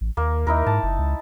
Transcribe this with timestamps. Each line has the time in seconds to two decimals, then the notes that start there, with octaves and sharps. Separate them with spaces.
0.01 A1
0.17 D#2 A#3
0.47 D#2 D#4 E4 A#4
0.66 G#2 A5
0.83 F#1
0.98 C#2